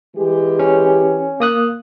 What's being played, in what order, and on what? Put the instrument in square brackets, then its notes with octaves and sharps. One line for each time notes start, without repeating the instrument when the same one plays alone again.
[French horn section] E3 G#3 G4
[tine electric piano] C#4
A#3 D#6 F#6